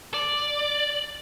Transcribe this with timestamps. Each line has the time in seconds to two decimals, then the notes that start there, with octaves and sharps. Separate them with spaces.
0.14 D5